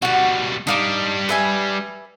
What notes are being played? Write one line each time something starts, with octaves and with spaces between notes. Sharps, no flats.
B2 G3 F#4 F#5
G3 D4 D#4 F5 D6
B4 E5 G#5